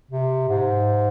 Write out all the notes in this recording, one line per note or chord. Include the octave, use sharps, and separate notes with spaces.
C3
G#2